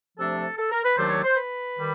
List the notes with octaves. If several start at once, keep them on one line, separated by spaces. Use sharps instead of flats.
C3 F3 A3 D4 A4
A4
A#4
B4
D#2 D#3 F#3 A3 D4 C5
C#5
C5
B4
D#3 G3